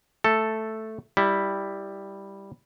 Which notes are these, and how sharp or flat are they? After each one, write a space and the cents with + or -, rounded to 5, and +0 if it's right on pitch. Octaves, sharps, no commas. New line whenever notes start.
A3 +0 A4 +0
G3 +5 E4 -10